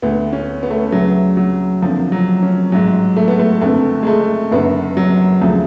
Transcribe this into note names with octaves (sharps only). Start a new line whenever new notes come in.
D2 D3 B3
C#4
B3
A3
B3
D2 C#3 F#3
F#3
F#1 F2 D3 F3
F#3
C#4
A1 G#2 F#3
A3
B3
A3
F#1 F2 D3 A3
G#3
A3
F#1 F#2 D3 B3
F#3
D2 C#3 F3